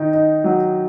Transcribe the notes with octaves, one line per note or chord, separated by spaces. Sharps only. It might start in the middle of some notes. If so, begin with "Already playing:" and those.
Already playing: D#3 D#4
D#4
F#3